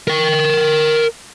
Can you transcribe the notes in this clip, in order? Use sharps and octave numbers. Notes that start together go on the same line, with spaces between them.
A#4 G5